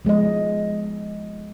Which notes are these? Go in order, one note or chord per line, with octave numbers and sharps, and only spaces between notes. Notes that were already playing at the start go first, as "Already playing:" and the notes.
F3 G#3 B3 D#5